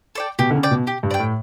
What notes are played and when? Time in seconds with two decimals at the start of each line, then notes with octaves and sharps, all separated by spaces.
0.15 A4 D5 G5
0.39 B2 G4
0.50 D3
0.55 C#3
0.63 D5 G5
0.71 B2
0.87 G4
1.03 G2
1.11 D5 G5
1.19 A2